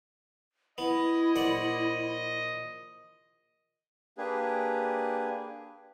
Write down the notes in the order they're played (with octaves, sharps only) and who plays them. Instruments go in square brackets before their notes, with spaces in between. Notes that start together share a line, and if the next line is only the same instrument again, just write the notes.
[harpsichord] B3 [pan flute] E4 [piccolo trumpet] D#5
[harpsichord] A#1 D5 F#5
[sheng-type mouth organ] A#3 D4 G4 G#4 B4